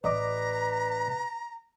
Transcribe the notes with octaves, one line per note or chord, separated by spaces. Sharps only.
A1 B4 D5 D#5 A#5 D6